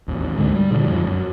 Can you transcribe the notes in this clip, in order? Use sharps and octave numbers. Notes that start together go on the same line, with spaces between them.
A1 D#2
C#2 G#2 D3 G#3
G3
A#2 D3 D#3
F2 G#2 F3
F#2